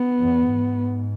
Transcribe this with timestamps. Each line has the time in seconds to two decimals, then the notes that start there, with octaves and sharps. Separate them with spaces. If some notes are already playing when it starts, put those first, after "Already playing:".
Already playing: B3
0.21 E2
0.51 G#2